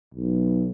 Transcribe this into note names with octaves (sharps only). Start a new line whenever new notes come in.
B1